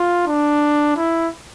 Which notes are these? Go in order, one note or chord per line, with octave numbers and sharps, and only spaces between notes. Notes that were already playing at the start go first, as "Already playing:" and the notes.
Already playing: F4
D4
E4